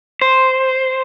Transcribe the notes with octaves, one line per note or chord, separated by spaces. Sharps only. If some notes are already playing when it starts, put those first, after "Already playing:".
C5